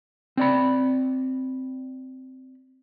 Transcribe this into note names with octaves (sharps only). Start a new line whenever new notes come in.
C4 D5 B5